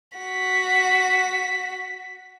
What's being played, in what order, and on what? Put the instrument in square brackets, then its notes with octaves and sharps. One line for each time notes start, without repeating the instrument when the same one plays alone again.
[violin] F#4 B6